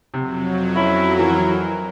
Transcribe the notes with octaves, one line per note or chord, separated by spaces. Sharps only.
F2 C3 F#3
C#4 E4
E3 A#4